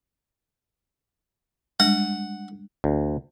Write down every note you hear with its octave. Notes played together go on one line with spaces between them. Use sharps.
G3 G#3 D4 F#5
D2